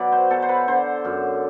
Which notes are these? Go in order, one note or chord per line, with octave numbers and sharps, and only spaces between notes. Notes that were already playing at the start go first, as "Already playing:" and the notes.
Already playing: B2 F#3 D5 E5
C5
B2 A4
C5
B4
D3 C5
F#2